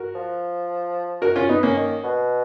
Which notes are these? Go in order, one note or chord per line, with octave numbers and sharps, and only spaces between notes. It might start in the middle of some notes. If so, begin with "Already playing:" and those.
Already playing: F#4 A#4
F3
F#4 A#4
C#4 F4
B3 D#4
A#3 C#4
D#3
B2